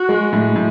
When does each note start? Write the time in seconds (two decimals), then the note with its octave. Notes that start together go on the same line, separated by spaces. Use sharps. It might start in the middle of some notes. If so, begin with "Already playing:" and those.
Already playing: F#4
0.09 G#3
0.33 A2
0.55 A2